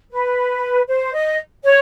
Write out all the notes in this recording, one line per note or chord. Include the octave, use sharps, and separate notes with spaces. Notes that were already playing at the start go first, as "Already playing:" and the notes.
B4
C5
D#5
C#5